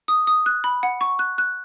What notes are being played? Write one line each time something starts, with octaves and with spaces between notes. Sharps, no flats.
D#6
D#6
F#6
B5
F#5
C#6
F#6
F#6